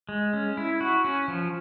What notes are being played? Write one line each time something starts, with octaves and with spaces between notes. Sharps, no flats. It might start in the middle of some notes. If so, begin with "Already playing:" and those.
G#3
C#4
E4
F#4
C#4
F3